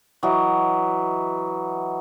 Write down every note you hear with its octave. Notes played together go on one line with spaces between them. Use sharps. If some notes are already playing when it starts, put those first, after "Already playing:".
E3 F#3 D#5